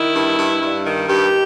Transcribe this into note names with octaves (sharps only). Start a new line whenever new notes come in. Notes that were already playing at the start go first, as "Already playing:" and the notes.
Already playing: D#3 E4
G2
G2
G2
D#3
G2 G4